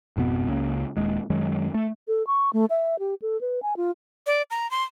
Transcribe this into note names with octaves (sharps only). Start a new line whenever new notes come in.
G#1 F2 B2 B3
C#2 C#3 A#3
D#1 D#2 G#3
F#2 D#3 F#3 G#3
A3
A4
C#6
A3
E5
G4
A4
B4
G#5
F4
D5
A#5
C6